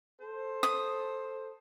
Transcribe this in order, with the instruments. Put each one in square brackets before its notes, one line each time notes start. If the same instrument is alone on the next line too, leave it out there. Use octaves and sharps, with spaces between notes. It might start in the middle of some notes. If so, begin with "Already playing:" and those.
[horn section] A4 C5
[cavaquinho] D#6